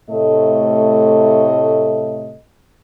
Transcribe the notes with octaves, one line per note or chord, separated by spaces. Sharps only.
A2 C3 A3 A4 D#5